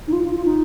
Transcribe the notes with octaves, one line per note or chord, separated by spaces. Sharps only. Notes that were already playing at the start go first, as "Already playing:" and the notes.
D#4
F4
F4
F4
D#4